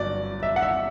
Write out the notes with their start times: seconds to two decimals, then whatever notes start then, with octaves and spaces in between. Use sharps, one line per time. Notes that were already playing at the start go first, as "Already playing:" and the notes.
Already playing: G1 F#3 D5
0.43 E5
0.56 F#5
0.63 E5